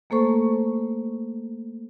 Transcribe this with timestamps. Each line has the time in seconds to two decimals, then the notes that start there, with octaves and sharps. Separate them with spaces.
0.10 A3 A#3 A4 C5 C#6